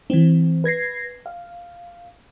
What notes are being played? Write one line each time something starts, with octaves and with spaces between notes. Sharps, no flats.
E3 C4
B4 G#6 A#6 C7
F5